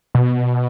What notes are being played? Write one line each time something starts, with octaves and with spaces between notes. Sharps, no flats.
B2